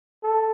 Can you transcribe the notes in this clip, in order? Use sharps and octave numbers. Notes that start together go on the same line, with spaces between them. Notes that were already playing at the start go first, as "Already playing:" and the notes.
A4